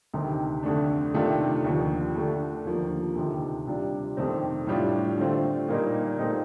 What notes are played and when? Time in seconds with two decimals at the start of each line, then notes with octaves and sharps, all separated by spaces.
0.14 D2 C3 D#3
0.63 F2 D3 A3 D4
1.14 C3 D#3 A3 D4 F4
1.64 D#2 D3 F3
2.15 D3 A3 D4
2.66 D#2 D3 F3 A#3
3.16 D2 C3 D#3
3.67 C3 G3 D4 F4
4.17 F2 C3 D#3 A3 C4
4.67 A2 G3 D4 F4
5.18 D3 A3 C4 F4
5.69 A#2 G3 A#3 D#4
6.19 A#2 A3 C4 D#4